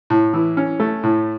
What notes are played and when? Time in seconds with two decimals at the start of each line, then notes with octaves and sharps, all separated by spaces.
0.10 A2
0.33 E3
0.57 C#4
0.80 A3
1.03 A2